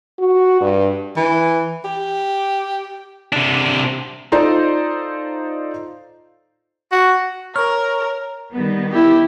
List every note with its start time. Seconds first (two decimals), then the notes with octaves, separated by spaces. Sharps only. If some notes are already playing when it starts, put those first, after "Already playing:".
0.19 F#4
0.61 G2
1.17 E3
1.85 G4
3.33 C3 D4
4.32 D#4 F4 A4 C5 D5 A#5
6.92 F#4
7.56 A#4 C#5 F6
8.52 D#3 G3 B3
8.93 E4 G4